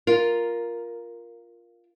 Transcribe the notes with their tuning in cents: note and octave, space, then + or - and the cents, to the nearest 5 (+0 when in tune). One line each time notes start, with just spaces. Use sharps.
F4 +0 A#4 +5